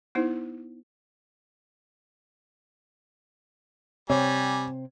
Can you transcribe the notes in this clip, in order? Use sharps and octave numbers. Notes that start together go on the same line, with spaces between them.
B3 D#4 E4 C5
C3 G3 C4 C#5 G#5